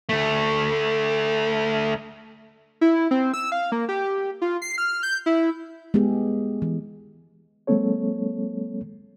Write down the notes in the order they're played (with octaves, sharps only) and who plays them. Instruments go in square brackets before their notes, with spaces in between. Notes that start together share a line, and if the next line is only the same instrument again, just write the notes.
[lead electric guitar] D2 A3
[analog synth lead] E4
C4
E6
F5
A#3
G4
F4
C7
F6
G6
E4
[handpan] G#3 B3 G4 G#4
E3
[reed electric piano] F#3 G#3 A#3 C4 A4 C#5